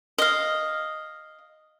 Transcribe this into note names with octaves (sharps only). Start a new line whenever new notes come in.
D#5 F5